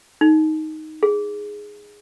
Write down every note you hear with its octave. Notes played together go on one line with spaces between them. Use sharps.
D#4
G#4